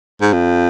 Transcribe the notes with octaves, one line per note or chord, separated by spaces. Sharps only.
G#2
F2